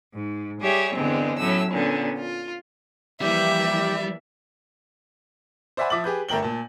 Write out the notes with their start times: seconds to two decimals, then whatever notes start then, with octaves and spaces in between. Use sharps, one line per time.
0.14 G#2
0.61 G3 G4 G#4 C#5 E5
0.95 E2 G2 D3 G#3 C4
1.38 A2 F#3 C#4 E6
1.72 A#2 D3 B3 C#4
2.20 F4
3.22 E3 F3 G3 A#3 G4 E5
5.77 C5 D5 E5 F#5 G#5 B5
5.90 F3 E5 D6 D#6 A6 F#7
6.04 G4 G#4 B4 G6
6.29 G1 A3 A#4 G5 F#7 G7
6.43 A#2 A5